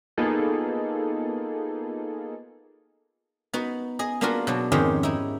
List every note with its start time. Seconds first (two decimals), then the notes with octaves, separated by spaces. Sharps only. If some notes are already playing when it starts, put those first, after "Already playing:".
0.18 A#3 B3 D#4 F4 G#4 A4
3.53 B3 D#4 F#4
3.99 G#4 D#5
4.21 A#3 B3 D4 F4 F#4 A#4
4.47 B2 F#3 D4
4.72 F2 G#2 D#3 C#4 G4 G#4
5.03 D#4 E4